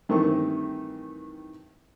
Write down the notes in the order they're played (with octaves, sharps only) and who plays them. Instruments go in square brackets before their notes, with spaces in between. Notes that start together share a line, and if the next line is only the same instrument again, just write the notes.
[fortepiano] G2 D#3 E3 A3 C4 C#6